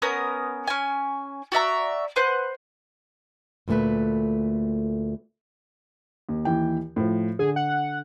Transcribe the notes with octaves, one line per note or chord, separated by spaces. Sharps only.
B3 C#4 A#4 D#6
C#4 G#5
F#4 D5 E5 A#5
B4 C5 F#5 F#6
D2 A#2 D3 A3 B4
D#2
D#2 E3 G5
A2 F3
D3 G#4
F#5